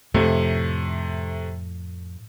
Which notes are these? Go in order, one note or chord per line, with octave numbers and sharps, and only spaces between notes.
F2 A2 C3 A3